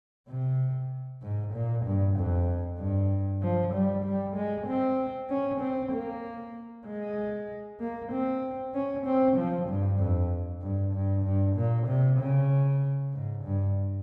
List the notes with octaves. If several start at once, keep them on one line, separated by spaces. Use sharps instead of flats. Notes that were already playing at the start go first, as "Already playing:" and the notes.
C3
G#2
A#2
G2
F2
G2
F3
G3
G3
G#3
C4
C#4
C4
A#3
G#3
A#3
C4
C#4
C4
F3
G2
F2
G2
G2
G2
A#2
C3
C#3
G#2
G2